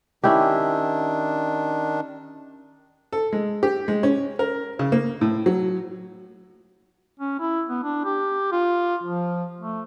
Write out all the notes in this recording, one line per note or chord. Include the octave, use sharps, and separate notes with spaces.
D#3 C#4 D4 E4 G4
A4
G#3
G4
G#3
C#4
A#4
C#3
A#3
A2
F#3
C#4
E4
B3
D4
G4
F4
F3
A3